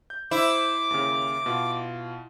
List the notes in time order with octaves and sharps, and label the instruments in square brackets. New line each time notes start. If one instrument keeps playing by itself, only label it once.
[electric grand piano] G6
[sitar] E4 [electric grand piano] C5 [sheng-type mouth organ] D6
[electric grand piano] D#2 C#3
B2 F4